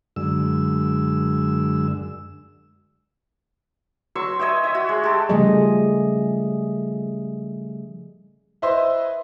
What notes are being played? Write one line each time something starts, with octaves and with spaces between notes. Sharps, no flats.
F#2 D3 G#3 E6
F#3 C6 C#6 E6
C#5 D#5 E5 G5
C#5 E5
F#4
G#3
G4 A4
C#3 F3 G3 A3 G#4 D#5
E4 B4 C5 D#5 E5 C6